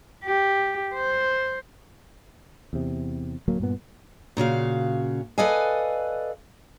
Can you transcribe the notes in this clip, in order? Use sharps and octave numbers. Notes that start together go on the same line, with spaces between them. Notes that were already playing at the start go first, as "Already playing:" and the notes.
G4
C5
E2 C3
D1 F#3 A#3
G2 A#2 B3
A#2 C#3 F#4 F5
A4 B4 D5 D#5 F5 G#5